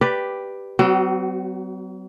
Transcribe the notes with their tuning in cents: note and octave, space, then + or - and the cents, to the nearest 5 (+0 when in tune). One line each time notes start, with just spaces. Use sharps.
G4 +0 B4 +0 D5 +5
F#3 +40 C4 -45 F#4 +0